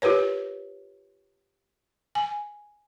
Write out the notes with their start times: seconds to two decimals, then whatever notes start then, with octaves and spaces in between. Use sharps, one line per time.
0.02 F4 G4 A#4 B4 C#5
2.15 G#5